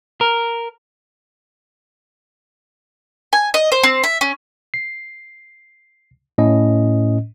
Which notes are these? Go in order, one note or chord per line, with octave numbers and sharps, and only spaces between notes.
A#4
G#5
D#5
C5
C4
E5
C#4
C7
A2 C#4 D#5